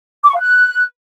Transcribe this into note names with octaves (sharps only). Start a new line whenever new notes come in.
D6
C#6
F5
F#6